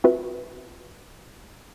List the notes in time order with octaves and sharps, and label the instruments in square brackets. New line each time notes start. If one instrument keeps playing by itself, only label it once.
[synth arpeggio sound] C4 F4 F#4 B4 E5